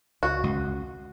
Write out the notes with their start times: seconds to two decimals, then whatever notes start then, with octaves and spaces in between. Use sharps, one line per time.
0.23 C#2 F#4
0.43 C#2